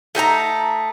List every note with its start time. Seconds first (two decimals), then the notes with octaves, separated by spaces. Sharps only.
0.15 A3 D#4 G#5 A#5